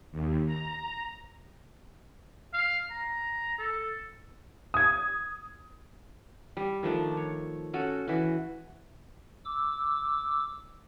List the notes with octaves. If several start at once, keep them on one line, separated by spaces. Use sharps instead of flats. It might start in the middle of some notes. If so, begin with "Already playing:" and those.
D#2
A#5
F5
A#5
A4
D#6 G#6
G3
D#3 F3 A3 D4
C#5
C#4 F#4 A4
E3 F#4
D6 E6